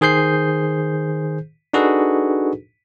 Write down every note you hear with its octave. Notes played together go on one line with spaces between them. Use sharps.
D#3 G#4 C5 G6 C7
D4 D#4 F#4 G#4 A4 B4